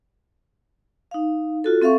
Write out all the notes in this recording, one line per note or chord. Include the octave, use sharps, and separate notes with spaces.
D#4 F5
F4 F#4 A4
C4 A4 E5 F5 C#6